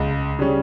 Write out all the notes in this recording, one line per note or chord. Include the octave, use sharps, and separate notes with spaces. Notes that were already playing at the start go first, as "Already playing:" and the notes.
Already playing: C#2
C#3 G3 C#4